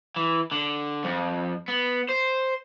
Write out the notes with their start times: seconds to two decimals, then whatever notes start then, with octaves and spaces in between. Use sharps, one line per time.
0.16 E3
0.52 D3
1.04 F2
1.68 B3
2.09 C5